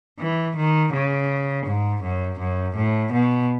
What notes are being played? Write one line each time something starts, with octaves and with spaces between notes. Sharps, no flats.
E3
D#3
C#3
G#2
F#2
F#2
A2
B2